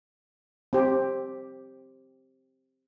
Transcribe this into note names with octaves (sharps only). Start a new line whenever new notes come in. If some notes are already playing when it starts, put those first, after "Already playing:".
C4 G4